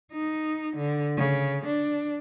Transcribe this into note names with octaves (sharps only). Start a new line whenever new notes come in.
D#4
D3
C#3
D4